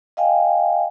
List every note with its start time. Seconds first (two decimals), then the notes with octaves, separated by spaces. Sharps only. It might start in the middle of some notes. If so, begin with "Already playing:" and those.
0.17 D#5 F5 G5 G#5